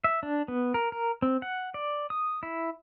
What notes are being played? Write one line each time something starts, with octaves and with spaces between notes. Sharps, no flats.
E5
D4
B3
A#4
A#4
C4
F#5
D5
D#6
E4